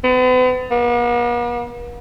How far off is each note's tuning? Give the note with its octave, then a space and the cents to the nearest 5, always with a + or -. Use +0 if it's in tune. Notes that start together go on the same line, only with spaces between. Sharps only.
B3 +40
B3 -45